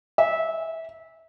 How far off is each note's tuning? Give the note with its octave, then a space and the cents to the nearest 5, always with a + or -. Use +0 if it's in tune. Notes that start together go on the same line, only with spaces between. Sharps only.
E5 -20